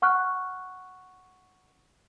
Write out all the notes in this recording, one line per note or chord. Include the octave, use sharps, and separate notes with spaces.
F#5 C#6 F6 F#6